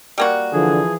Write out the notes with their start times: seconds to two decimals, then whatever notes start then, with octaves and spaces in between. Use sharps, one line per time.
0.18 G3 A#3 F#4
0.53 D3 E3 F3 G#4